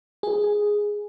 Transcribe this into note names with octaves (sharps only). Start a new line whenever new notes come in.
G#4